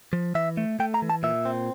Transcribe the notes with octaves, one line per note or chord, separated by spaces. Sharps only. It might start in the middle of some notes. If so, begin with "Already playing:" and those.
F3
E3 E5
A3
A3 G5
A#5
E3
A5
A#2 E5
C4